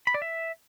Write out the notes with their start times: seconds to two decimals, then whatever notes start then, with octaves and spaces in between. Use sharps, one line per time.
0.07 B5
0.14 D5
0.22 E5